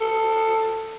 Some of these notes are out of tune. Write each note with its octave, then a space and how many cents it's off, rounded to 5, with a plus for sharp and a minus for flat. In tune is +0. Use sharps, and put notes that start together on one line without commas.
A4 +15